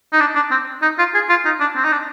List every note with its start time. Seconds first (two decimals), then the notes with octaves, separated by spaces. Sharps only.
0.13 D#4
0.20 D4
0.35 D4
0.51 C4
0.82 D#4
0.98 F4
1.14 G#4
1.29 F4
1.45 D#4
1.60 D4
1.76 C4
1.84 D#4
1.91 D4